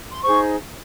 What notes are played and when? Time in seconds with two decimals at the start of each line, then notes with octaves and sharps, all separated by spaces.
0.12 C6
0.23 D#4 G#4 C5 C#6